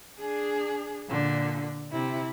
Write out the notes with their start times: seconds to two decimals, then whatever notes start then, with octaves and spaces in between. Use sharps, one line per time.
0.19 D4 G#4
1.09 A#2 D3
1.91 C3 E4